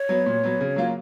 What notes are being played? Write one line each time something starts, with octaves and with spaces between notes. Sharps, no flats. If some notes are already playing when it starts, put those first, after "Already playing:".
Already playing: C#5
F#3 B3
A#2
F#3 B3
C#3
F#3 A#3 F4